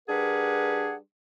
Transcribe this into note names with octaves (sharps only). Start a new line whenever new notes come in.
G3 D4 G#4 A#4 B4 F#5